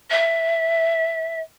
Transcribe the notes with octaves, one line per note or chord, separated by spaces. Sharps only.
E5